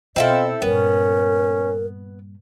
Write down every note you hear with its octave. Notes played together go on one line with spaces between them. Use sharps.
B2 C4 E4 F4 A4 D#5
G2 A#2 B3 C#4 A#4